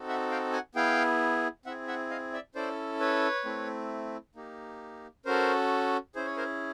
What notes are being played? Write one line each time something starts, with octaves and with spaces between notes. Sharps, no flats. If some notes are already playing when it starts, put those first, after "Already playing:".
Already playing: C4 D#4 F#4 A4
E5 F#5
F5 G5
F#5 G#5
B3 E4 G#4 F5 G5
C4 E4 G#4 E5 F#5
E5 F#5
D#5 F5
D5 E5
C#4 E4 A4 C5 D5
B4 C#5
A3 C4 E4
A#3 D#4 G4
C#4 F#4 A4 A#4 C5
C#4 E4 G#4 C5
C#5
A#4 C5